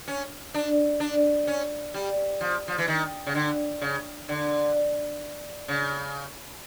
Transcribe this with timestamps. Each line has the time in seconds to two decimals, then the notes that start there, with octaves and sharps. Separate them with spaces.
0.08 C#4
0.54 D4
1.00 D4
1.47 C#4
1.94 G3
2.41 F3
2.68 F3
2.78 E3
2.88 D#3
3.27 C#3
3.35 D3
3.82 C#3
4.29 D3
5.68 C#3